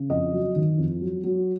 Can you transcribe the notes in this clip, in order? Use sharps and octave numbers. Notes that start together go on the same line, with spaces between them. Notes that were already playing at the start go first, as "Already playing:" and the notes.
Already playing: C#3
F2 D#5
F#3
D#3
F2
F#3
F#3